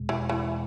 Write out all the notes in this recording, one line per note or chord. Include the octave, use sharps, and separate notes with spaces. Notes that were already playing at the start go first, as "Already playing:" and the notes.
Already playing: E2 B2 G#3
E3
E3